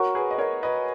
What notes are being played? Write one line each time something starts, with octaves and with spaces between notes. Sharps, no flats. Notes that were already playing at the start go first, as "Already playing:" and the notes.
Already playing: F#4 A#4 C#5 F#5 A#5 C#6
G#4 B4
D#5
A#4 C#5
B4 D#5